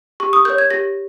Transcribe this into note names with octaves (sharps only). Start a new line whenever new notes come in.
G4 C#6
D#6
A#4 C#5 G6
G#6
G4 A#6